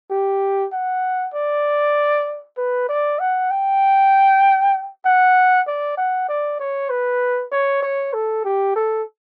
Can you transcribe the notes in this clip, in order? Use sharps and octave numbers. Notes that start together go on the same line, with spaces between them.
G4
F#5
D5
B4
D5
F#5
G5
F#5
D5
F#5
D5
C#5
B4
C#5
C#5
A4
G4
A4